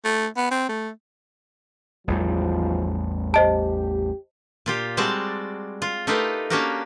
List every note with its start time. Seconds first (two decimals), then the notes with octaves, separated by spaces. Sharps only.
0.05 A3
0.37 B3
0.51 C4
0.69 A3
2.08 A1 E2 G#2 B2 F3 G3
3.34 G4 C5 D#5 A5
4.66 A#2 F4 G4
4.97 G3 G#3 C4 F#4 D5 A5
5.82 F4
6.07 A3 D#4 F4 G4 A#4 B4
6.50 A#3 C#4 D4 F#4 G4 A#4